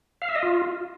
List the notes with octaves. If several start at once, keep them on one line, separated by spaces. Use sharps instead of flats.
F5
E5
D#5
F4